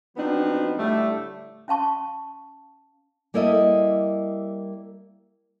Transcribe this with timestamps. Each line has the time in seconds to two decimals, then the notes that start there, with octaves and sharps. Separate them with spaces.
0.17 F3 F#3 B3 C4 D4 D#4
0.78 A2 D3 G3 A3
1.68 C#4 F5 A5 C#6
3.34 G3 A#3 E4 A4 D5 D#5